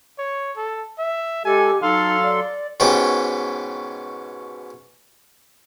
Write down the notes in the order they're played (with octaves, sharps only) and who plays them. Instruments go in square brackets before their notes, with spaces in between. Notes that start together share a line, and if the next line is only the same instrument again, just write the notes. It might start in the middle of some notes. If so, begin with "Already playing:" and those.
[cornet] C#5
A4
E5
[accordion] G#3 A4 [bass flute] G4 [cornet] G#5
[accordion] F#3 A4 C6 [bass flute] D#4 [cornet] F5
[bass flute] D5
[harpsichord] G#2 B2 C#4 G4